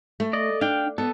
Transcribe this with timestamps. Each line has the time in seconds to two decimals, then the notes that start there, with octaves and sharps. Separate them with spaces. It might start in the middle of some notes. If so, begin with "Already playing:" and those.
0.20 A3
0.33 D5 D#5
0.61 D4 F5 G5
0.98 B3 A4